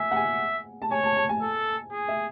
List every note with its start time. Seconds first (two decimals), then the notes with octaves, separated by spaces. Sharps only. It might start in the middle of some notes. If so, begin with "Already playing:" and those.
Already playing: E5 G#5
0.11 F#5
0.16 G#5
0.82 A5
0.91 C#5 G#5
1.04 A5
1.17 A5
1.29 G#5
1.42 A4
1.92 G#4
2.08 E5